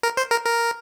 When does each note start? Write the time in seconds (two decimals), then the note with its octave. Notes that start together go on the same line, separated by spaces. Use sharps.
0.03 A#4
0.17 C5
0.31 A#4
0.45 A#4